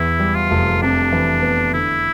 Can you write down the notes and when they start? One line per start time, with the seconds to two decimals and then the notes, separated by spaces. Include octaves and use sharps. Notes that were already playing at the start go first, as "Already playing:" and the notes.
Already playing: E2 E4
0.20 G3
0.35 F4
0.51 F1
0.82 C3 D4
1.12 E3
1.42 B3
1.73 D3 E4